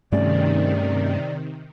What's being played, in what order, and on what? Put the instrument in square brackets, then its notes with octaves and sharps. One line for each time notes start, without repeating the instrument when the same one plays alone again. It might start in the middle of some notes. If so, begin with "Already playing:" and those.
[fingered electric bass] G2 A3 C#4 [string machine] C3 D#3 [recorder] D5